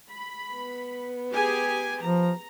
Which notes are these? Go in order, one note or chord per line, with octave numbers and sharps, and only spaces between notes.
B5
B3
G4 G#4 G#5
F3 A#5